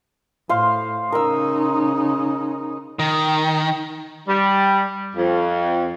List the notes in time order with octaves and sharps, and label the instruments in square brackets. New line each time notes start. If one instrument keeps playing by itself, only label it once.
[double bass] A2 [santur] C5 F5 C6
[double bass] C#3 D#4 [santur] A#4 E6
[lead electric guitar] D#3
[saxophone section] G3
F2